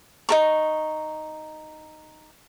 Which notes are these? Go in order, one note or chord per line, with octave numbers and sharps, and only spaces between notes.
D#4 A#4 C#6